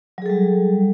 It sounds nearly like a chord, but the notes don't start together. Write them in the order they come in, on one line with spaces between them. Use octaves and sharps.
F#3 G#4 A4 G3